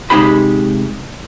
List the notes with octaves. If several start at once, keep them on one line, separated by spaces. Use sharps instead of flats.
C3 G#3 D#4 G4 C5 B5